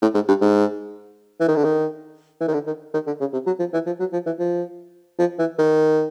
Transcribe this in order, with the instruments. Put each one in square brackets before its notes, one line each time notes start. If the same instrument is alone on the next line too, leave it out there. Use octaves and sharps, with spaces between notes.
[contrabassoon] A2
G#2
G2
G#2
E3
D#3
D3
D#3
E3
D#3
D3
D#3
D#3
D3
C#3
C3
F#3
F3
E3
F3
F#3
F3
E3
F3
F3
E3
D#3